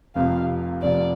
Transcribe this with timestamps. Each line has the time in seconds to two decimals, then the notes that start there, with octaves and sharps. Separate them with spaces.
0.16 F1 F2 C3 F3 F5
0.82 F1 F2 C3 F3 D5